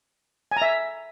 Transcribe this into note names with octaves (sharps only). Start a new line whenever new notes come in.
G#5
A#5
E5